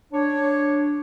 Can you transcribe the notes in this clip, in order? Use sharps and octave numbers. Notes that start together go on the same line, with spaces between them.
D4 C#5